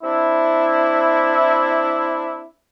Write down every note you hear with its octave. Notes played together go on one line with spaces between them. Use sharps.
C4 D4 E4